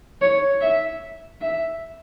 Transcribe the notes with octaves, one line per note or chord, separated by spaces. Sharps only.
C#5
E5
E5